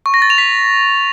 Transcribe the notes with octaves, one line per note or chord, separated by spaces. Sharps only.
C#6
A#6
A6
F7
B6